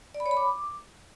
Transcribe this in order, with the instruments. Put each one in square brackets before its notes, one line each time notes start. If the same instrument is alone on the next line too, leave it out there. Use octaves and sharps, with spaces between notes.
[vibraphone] D5
B5
C#5
B5
D6